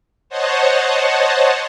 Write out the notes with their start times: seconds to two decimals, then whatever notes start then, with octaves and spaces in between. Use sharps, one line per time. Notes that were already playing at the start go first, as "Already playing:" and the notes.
0.29 C5 C#5 D#5 F#5 A5